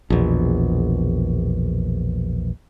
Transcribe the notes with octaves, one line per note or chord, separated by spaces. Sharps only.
A#1 E2 B2